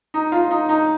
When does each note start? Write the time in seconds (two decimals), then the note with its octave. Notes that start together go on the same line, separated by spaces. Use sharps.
0.14 D#4
0.32 F4
0.51 D#4
0.69 D#4